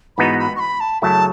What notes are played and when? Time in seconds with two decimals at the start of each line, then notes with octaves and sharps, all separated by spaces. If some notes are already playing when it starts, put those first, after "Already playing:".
0.17 G#2 E3 B3 D#4 F#4 B5
0.39 B5
0.56 C#6
0.60 B5
0.80 A5
1.02 F#2 C#3 F#3 A3 E4 A5